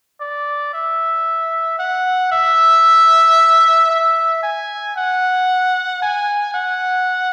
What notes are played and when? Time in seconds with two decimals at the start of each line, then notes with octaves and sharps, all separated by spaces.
0.20 D5
0.74 E5
1.79 F#5
2.32 E5
3.90 E5
4.43 G#5
4.96 F#5
6.02 G#5
6.54 F#5